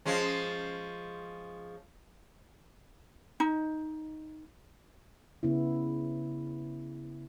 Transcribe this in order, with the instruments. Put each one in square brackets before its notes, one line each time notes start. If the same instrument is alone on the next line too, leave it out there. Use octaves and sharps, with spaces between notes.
[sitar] F3 G#3 C#4
[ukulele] D#4
[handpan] C#3 B3 E4